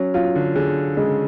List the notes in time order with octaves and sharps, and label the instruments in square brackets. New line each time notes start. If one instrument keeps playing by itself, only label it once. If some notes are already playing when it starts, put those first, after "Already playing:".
Already playing: [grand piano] F#3 [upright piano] C#4
[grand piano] F#3 [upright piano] F4
[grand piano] D3
[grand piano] D3 [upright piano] G#4
[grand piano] C#3 [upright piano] G#3